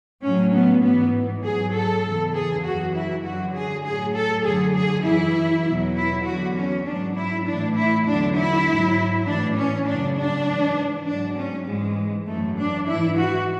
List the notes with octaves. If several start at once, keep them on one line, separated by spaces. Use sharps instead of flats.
A2 F#3 C#4
B3
G#2 E3 B3
G#2 F#3 G#4
A4
E2 C#3 E3
G#4
F#2 E3 F#4
E4
F#2 D3 F#3 F#4
G#4
A2 F#3 G#4
A4
F#2 D3 F#3 G#4
G#4
F#2 E3 E4
E2 B2 F#3
E4
E2 D3 F#3 F#4
C#4
G#2 F#3 D4
E4
A2 E3 D4
E4
E2 D3 F#3 D4
E4
G#2 F#3
A2 E3 D4
C#4
F#2 C#3 F#3 D4
D4
G#2 E3
G#2 F#3 D4
C#4
G#2 E3 G#3
F#2 E3 A3
D4
G#2 E3 E4
F#4